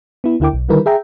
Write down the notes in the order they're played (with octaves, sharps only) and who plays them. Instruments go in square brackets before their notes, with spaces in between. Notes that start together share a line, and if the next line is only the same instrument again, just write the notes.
[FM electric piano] B3 E4
D2 D3 E4 A#4 G5 D6
B1
D3 D#3 G3 E4 A#4 B4
G#4 E5 G5 A#5